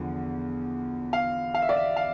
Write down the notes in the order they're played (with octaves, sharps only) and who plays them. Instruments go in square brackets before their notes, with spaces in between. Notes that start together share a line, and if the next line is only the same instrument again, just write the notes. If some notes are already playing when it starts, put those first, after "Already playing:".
Already playing: [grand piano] E2 D3 F3
F5
F5
E5
D5
E5
F5